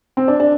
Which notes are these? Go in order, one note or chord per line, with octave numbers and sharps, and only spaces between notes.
C4
D4
D4